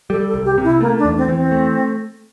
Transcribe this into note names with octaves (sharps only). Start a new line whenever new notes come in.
G3 A4
A4
C2
G4
C3
E4
A3 A#3
D4
E2
C4
E3
C4
A3